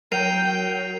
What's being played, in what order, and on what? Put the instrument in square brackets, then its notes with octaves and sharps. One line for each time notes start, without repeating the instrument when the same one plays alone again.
[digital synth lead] F#3 [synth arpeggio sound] A#4 [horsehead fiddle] G5 [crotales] C7 D#7 F7